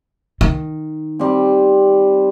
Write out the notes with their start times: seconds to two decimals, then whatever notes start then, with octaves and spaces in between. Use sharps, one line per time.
0.41 D#3
1.19 G3 C4